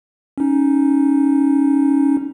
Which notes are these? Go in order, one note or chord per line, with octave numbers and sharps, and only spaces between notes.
C#4 D#4